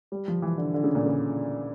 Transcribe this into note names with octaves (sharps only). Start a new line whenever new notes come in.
G3
F3
E3
D3
D3
C#3
A#2
C#3